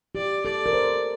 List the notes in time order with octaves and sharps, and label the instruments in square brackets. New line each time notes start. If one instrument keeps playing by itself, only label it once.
[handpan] G4 [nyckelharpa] D5
[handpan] A4 [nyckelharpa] D5
[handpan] A#4
C5